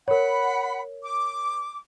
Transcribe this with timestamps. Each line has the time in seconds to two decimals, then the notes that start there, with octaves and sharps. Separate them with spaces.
0.08 A#4 C#5 F#5 B5
1.02 D6